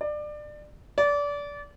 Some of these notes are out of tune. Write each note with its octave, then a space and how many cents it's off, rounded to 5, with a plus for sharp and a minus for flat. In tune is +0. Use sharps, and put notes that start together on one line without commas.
D5 +25
D5 -25